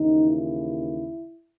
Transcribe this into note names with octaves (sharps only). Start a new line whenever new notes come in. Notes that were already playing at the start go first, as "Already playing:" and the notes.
Already playing: D#2 C#3 E3 D#4
E4